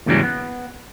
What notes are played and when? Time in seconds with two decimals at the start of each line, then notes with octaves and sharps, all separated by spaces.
0.06 D#2 G#2 C#3 E3 F#3 G3
0.23 B3